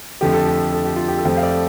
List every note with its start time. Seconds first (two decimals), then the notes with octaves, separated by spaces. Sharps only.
0.21 F2 D3 F3 A3 G4
0.34 A4
0.47 G4
0.73 A4
0.85 G4
0.96 F4
1.08 G4
1.18 A4
1.25 F2 F3 A3 G4 C5
1.37 F5
1.42 A4 D5